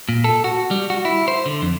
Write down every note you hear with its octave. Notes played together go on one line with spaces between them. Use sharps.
A#2
A4
F#4
G3
F#4
E4
C5
D3
F2